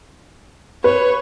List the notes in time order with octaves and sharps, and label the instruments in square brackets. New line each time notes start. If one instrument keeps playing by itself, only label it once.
[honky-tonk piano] B4 [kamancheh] C#5